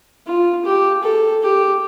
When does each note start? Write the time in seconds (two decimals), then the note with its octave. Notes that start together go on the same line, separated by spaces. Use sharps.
0.26 F4
0.65 G4
1.03 A4
1.43 G4